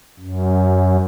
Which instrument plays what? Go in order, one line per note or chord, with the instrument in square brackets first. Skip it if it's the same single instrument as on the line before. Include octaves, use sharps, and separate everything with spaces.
[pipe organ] F#2